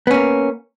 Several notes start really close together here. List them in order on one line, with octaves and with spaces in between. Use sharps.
B3 C#4 A#3